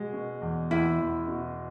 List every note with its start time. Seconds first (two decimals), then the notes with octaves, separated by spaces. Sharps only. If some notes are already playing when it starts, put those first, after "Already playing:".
Already playing: B2 G#3
0.13 B2
0.42 E2
0.71 E2 E4
0.99 E2
1.27 B2